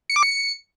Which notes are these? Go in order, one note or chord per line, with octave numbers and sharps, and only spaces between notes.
C#7
D6
C#7